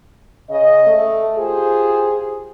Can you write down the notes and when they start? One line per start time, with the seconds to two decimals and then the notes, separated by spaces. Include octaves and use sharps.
0.50 C#3 D#5
0.87 A3
1.38 F4 G4 G#4 C5